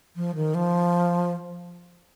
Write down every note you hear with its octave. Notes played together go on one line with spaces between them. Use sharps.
F3
D#3
F3